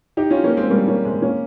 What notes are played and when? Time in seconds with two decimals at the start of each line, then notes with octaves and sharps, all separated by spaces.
0.17 D#4 G4
0.30 C#4 F4
0.44 A#3 C#4
0.57 G#3 C4
0.70 G3 A#3
0.88 A#3 C#4
1.05 G#3 C4
1.22 A#3 C#4